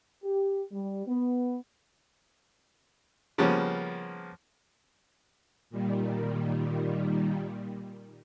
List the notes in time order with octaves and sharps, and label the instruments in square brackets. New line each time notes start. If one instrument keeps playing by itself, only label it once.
[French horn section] G4
G3
B3
[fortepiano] C#3 F3 G3 A#3 B3 C#4
[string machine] A#2 D#3 G3